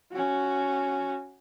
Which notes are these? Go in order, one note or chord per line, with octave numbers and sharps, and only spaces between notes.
C#4 F#4